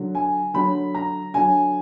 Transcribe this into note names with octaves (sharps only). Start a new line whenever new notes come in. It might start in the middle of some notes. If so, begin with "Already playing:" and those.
Already playing: D3 F#3
G#5
D3 F#3 B5
A#5
D3 F#3 G#5